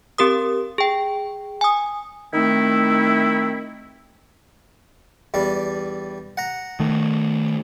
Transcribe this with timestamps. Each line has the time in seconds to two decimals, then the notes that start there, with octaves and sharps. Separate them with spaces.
0.18 C4 G4 A#4 D#6
0.78 G#4 G5
1.61 G#5 D#6
2.34 D#3 A3 C4 D#4 E4
5.34 E2 G3 D4
6.37 F#5 A#5
6.80 D#3 A3